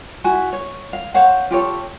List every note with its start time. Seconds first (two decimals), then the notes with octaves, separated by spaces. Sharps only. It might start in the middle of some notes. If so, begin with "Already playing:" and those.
0.24 E4 F#4 G#5
0.53 C#5
0.93 F5
1.14 C5 C#5 F5 F#5
1.51 F4 G4 A4 C#5